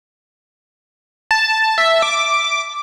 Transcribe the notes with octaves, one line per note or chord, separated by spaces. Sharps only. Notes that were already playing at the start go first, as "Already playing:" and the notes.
A5
E5
D6